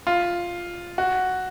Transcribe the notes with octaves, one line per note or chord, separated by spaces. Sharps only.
F4
F#4